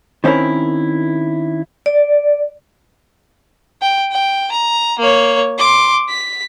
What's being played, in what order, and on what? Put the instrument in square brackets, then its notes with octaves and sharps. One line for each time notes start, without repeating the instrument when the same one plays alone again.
[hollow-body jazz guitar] D#3 C4 C#4 E4 A#4
[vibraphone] D5
[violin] G5
G5
A#5
A#3 C#5
C6 D6
B6